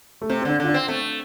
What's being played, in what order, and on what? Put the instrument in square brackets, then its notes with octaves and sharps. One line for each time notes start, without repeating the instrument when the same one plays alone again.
[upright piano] A3
[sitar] C3 [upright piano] C4
[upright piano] C4
[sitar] D3 [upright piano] D4
[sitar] D3 [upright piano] F4
[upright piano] D4
[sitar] C4
[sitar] A3 [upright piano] C4